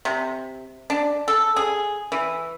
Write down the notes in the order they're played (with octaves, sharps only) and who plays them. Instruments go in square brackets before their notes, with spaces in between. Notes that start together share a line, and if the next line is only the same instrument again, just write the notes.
[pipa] C3
D4
A4
G#4
E3